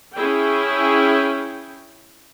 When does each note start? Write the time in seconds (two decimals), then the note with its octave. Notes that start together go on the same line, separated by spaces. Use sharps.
0.15 C#4 E4 G#4 G5